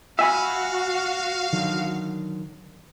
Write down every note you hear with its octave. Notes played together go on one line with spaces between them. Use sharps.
F#4 E5 F5 G#5 B5
D3 D#3 F#3